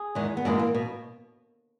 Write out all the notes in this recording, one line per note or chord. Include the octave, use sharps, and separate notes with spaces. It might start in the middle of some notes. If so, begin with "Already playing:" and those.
Already playing: G#4
E2 D#3 G#3
B3
F#2 E3 G#3 A#3
A#3
B2